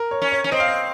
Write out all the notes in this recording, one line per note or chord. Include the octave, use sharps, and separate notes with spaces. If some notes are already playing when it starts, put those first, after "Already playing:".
Already playing: A#4
C#5
C#4
C#5
C#4
C4 D#5
F5
D#5